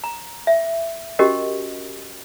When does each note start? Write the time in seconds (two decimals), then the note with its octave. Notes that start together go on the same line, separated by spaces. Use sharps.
0.04 A#5
0.47 E5
1.19 C#4 F#4 G4 A#4 D#5